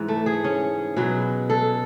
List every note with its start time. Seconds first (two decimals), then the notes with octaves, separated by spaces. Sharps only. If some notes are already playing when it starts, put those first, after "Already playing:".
Already playing: G#2 E3
0.08 A3
0.26 G#4
0.44 C#4
0.97 B2 F#3 G#4
1.50 A4